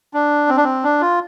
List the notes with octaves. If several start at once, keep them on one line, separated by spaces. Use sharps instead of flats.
D4
C4
D4
C4
D4
F4